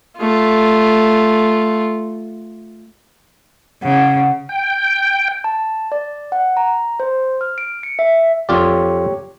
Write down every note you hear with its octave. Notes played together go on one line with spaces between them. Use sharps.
A3 F4
C#3 F#5
G5
A5
D5
F#5
A#5
C5
F6
D7
C#7
E5
F2 F4 G4 C#5 D5